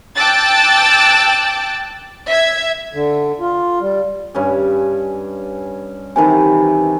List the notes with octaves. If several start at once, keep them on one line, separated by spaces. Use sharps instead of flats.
G5 A5 D6 E6 F#6 A6
E5 G#6
D3
F4
G3
G2 C#4 G#5
C3 D#3 E3 D#4 G#5